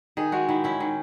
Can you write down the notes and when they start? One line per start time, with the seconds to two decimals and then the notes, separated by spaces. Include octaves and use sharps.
0.17 D#3 G#4
0.32 G#3 F#4
0.49 D#3 E4
0.64 C#4 E4
0.80 D#3